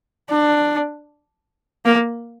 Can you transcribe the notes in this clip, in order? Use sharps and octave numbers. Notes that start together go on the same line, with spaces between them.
D4
A#3